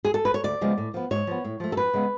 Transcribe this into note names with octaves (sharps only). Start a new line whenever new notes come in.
G#4
A4
B4
C#5
D2 D5
C#3 F3 G#3 B3
A2
F3 B3
G#2 C#5
F3 B3
A2
F3 A3
A4
F2 B4
C#3 G#3 B3